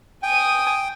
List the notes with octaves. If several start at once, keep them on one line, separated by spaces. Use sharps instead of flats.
G5 G#5 D#6